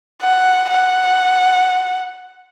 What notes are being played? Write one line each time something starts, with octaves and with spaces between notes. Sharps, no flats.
F#5
F#5